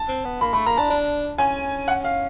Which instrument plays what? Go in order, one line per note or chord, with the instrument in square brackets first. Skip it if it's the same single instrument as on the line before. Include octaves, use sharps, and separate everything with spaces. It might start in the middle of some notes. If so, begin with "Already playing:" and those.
Already playing: [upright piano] A5
[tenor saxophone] C4
B3
[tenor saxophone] A#3 [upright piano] B5
[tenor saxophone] A3 [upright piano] B5
[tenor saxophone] A#3 [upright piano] A#5
[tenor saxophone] D4 [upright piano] A5
[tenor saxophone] D4
[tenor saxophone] C#4 [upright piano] G#5
[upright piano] F#5
F5